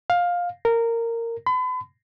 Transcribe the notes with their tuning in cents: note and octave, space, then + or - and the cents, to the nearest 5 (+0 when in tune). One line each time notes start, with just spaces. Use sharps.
F5 +15
A#4 -15
B5 +40